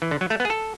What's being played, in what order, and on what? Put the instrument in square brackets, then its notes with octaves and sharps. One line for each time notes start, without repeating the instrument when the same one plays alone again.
[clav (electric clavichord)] E3
D3
F#3
A3
B3
G#4
A4